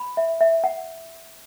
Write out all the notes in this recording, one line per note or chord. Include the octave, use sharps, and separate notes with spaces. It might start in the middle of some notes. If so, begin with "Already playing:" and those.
Already playing: B5
E5
E5
F#5